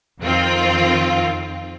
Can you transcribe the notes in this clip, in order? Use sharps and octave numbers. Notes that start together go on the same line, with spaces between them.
F2 D#3 C4 F4